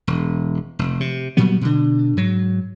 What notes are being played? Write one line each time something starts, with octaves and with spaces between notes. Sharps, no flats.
E1
F1
C3
A#2 F#3 G3 B3
B2 D3
G#2 F#3